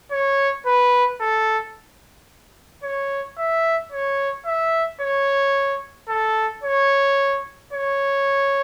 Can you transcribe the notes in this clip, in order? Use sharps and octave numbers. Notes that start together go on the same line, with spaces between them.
C#5
B4
A4
C#5
E5
C#5
E5
C#5
A4
C#5
C#5